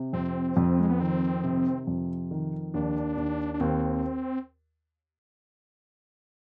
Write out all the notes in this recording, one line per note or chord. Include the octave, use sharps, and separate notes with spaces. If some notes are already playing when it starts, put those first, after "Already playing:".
Already playing: C3
F2 C4
F2
G#3
B3
D#3 C4
C3
F2
D#3
D#2 D4
D#2
D4
D#2 C4